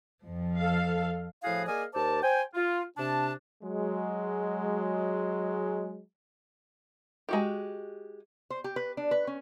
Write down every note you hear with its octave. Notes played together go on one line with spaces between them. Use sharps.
F2 F3
A4 F5
A2 F3 E4 F#4 G#4 F5
A#3 G#4 D5 D#5 F5 G#5
D#2 A#4 C5 D5 A5
C5 G5 G#5
F4
C3 D4 A5
F#3 G#3
G#3 F#4 G4
C5
G4
B4
D4
B4
C#4